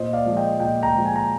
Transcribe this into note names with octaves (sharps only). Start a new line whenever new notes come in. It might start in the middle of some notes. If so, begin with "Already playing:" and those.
Already playing: A#2 C5 D#5
D5 F5
F3 G#3
D#5 G5
A#2 D#5 G5
G5 A#5
F3 G#3
G#5
A#5